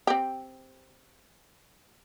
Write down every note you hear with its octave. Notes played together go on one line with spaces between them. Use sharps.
C4 G4